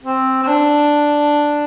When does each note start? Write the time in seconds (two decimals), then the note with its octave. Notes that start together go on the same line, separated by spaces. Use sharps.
0.03 C4
0.43 C4
0.48 D4